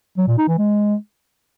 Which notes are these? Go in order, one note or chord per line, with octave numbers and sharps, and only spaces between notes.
F#3
A#2
D#4
E3
G#3